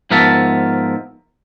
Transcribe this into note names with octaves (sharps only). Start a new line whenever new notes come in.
G#2 F3 B3 A#4 E5 A5